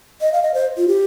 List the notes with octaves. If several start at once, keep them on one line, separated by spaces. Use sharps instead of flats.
D#5
F5
D#5
C5
F4
G4